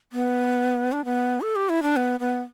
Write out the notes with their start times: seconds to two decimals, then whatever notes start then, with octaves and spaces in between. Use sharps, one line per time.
0.13 B3
0.92 D4
1.05 B3
1.41 A4
1.56 G4
1.69 E4
1.83 D4
1.96 B3
2.20 B3